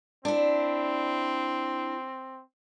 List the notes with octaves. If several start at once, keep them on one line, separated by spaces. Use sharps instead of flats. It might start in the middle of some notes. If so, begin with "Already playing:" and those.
C4 D4 E4